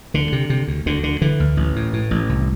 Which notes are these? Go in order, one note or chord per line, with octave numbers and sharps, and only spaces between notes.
D2 D3
C3
C3
D2
D2 D3
D3
D3 E3
D2
A1
A2
A2
A1
C2